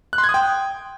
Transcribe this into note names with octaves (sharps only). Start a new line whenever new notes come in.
F#6
C6
G#6
D#6
G5